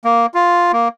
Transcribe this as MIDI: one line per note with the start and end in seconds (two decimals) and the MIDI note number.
0.05 0.26 58
0.34 0.72 65
0.73 0.88 58